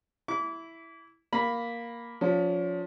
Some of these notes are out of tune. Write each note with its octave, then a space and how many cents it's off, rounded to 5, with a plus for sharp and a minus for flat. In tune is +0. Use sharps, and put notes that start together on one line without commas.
E4 +0 D6 -35
A#3 +5 B5 +0
F3 +25 C#4 +35